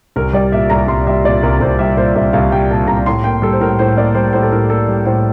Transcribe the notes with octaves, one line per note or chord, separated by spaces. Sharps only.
C2 A#4
G3 D5
A#2 E5
C2 A#5
C2 C6
G3 E5
A#2 D5
C2 A#4
C2 C5
G3 E5
A#2 C5
C2 E5
C2 F5
G3 G5
A#2 A5
C2 A#5
A2 C6
A#3 G5
G3 A4
C5
A2 A#4
A2 C5
A#3 D5
G3 C5
A2 C5
A4
A2 A#4
A#3 A4
G3
A2 C5